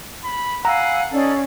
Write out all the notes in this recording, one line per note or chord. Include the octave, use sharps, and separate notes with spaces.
B5
F5 F#5 G#5 A#5 E6
C#4 D#4 A4 D5